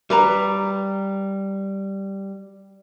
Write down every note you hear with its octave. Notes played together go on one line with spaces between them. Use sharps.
G3 B4 A#5